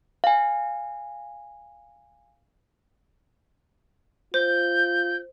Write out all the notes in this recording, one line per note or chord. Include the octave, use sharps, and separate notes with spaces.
F5 G#5
F4 C5 G6